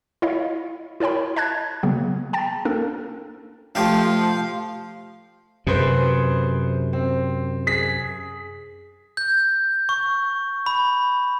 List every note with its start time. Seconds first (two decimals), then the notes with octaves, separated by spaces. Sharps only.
0.22 E4 F4 C#5 D#5 F5
1.00 E4 A#4 C#5 G5 B5
1.36 D#5 A5 F#6 G#6
1.83 C#3 F#3 G#3 A#3 B3
2.33 G5 A5 A6
2.65 A#3 C#4 D4 A4 A#4
3.75 F3 A3 G4 E5 F5
5.67 F#2 C3 G#4 B4 C5
6.93 C4
7.67 G#4 B6
9.17 G6
9.89 C#6
10.66 B5